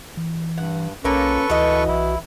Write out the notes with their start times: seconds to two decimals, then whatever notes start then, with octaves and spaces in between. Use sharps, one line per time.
0.17 E3
0.58 G2 F#5
1.04 B1 A#3 C#4 F4 A4 B4 C#6
1.50 D2 E3 F#4 D#5
1.88 B1 E4